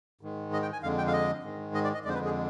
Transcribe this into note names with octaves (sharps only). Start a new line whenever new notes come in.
G#2 D#3 G#3
D#5
G5
G#5
F2 D3 G#3 F5
G5
F5
D#5
G#2 D#3 G#3
D#5
D5
D#5
F2 D3 G#3 C5 D5
B4
G#4